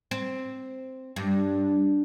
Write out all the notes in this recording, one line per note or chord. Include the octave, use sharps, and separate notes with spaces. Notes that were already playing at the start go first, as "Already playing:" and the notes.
C4
G2